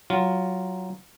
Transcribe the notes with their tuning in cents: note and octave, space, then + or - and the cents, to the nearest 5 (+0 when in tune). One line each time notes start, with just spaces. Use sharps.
F#3 +10 F4 +0